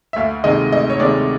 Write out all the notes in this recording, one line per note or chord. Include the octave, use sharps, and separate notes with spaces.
E5
D2 F5
C3 D#3 G#3 D#5
D2 D#5
C#5
C3 D#3 G#3 D5